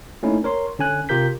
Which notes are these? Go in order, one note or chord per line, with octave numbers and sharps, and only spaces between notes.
A3 A#3 C#4 D#4 E4
A#4 C#5 C6
D3 C#4 G#5 F#6
C3 F4 G4 A#4 G6 B6